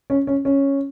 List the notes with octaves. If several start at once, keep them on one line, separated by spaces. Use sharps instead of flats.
C#4
C#4
C#4